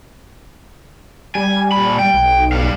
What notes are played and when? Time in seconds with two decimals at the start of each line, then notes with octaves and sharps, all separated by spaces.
1.35 G3 G#5
1.72 A#2 B5
1.99 G5
2.14 B1
2.52 G3 F5